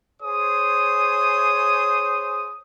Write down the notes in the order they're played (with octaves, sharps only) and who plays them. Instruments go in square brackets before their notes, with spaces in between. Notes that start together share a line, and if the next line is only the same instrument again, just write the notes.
[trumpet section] G#4 C5 C#5 D#6